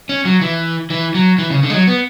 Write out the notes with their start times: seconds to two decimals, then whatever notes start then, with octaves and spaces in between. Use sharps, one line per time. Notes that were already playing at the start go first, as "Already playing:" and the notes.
0.09 C#4
0.25 F#3
0.42 E3
0.90 E3
1.15 F#3
1.38 E3
1.50 C#3
1.63 D3
1.70 G#3
1.74 F#3
1.87 B3